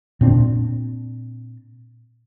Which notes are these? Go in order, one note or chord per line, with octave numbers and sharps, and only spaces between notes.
A#2 C4 D4